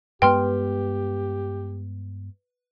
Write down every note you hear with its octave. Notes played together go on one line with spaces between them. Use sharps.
G2 G#3 B3 G4 B4 G5 C6 F6